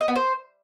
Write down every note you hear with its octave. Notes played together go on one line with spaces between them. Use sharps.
D#5
B3
C5